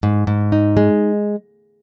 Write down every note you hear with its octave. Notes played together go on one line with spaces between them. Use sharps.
G#2
G#2
D#4
G#3